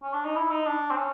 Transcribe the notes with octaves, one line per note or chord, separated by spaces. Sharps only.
C#4
D4
D#4
E4
D#4
D4
C4
C#4